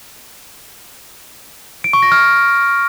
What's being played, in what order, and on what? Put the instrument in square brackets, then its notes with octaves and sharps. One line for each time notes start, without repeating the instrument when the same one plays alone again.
[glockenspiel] D7
C#6
A#6
F6